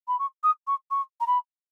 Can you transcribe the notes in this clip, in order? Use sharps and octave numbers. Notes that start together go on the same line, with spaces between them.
B5
C#6
D#6
C#6
C#6
A#5
B5